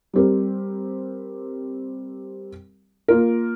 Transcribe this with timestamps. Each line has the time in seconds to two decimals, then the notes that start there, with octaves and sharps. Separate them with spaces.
0.13 G3 C4 G4 A#4
3.08 A#3 F4 A#4